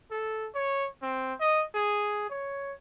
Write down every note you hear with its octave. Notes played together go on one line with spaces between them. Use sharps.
A4
C#5
C4
D#5
G#4
C#5